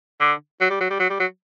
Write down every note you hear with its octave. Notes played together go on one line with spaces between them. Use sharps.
D3
F#3
G3
F#3
G3
F#3
G3
F#3